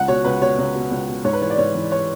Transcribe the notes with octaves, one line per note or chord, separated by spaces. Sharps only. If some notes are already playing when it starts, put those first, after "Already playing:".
Already playing: C#2 F#5
B2 C#5
C#2 B4
B2 C#5
C#2
B2
C#2
B2
G#2 C#5
B4
E3 C#5
D5
G#2 C#5
E3
C#5